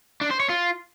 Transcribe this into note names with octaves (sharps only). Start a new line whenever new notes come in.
D4
C5
C#5
F4